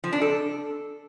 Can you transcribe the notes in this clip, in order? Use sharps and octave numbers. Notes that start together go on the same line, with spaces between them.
F3
D4
A4